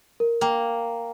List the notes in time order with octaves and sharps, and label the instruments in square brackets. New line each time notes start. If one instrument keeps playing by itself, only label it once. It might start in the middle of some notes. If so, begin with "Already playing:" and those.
[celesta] A#4
[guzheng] A#3 [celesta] G5